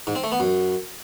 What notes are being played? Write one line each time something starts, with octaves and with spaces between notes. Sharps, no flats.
G#2
C4
A3
B3
F#2